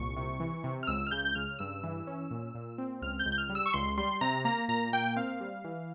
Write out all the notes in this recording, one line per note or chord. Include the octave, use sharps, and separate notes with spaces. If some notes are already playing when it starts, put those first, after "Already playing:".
Already playing: C2 A#2 C#6
C3
E3
C3
F6
C#2 E6
F6
C#3 G6
G6
C#3 F6
G2 E6
E3
C#4
A#2
A#2
C4
C#2 F6
G6
C#2
G6
F6
G3
E6
C#6
C#2 C6
G3 C6
C3 A#5
A#3 A#5
A#2 A#5
A#3 G5
C4 F5
G3
E3